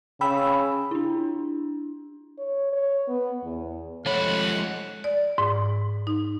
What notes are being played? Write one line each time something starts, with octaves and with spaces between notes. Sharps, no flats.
C#3 G5 B5 E6
D4 E4
C#5
C#5
B3
E2
F3 G#3 A3 C#5 F#5 B5
D5
G#2
D#4